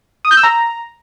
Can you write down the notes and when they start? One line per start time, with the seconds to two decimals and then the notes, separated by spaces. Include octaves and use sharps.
0.25 D#6
0.31 G6
0.37 E6
0.43 A#5